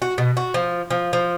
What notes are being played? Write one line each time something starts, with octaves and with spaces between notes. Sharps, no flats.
F#4
B2
F#4
F3
F3
F3